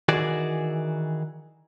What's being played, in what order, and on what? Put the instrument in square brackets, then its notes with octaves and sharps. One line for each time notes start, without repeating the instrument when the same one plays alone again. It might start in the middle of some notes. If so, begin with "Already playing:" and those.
[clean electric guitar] D#3 E3 F#4 G#4 D5